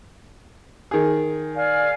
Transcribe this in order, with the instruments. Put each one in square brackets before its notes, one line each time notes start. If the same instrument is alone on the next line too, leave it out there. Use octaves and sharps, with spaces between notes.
[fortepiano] D#3 G#4
[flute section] D5 F5 G#5